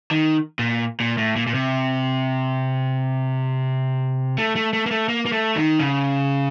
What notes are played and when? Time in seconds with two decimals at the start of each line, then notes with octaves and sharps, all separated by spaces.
0.11 D#3
0.59 A#2
1.00 A#2
1.18 A2
1.36 A#2
1.47 A#2
1.54 C3
4.38 A3
4.56 A3
4.73 A3
4.86 A#3
4.91 A3
5.08 A#3
5.26 A#3
5.32 A3
5.56 D#3
5.79 C#3